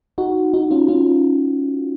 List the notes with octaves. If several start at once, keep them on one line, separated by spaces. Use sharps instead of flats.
D#4 F#4
D#4 F#4
C#4 F4
C#4 F4